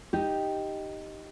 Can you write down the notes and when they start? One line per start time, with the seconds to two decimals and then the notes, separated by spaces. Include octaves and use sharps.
0.13 D#4 G4